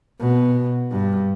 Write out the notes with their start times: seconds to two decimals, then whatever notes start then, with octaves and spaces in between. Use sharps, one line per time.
0.20 B2
0.91 G2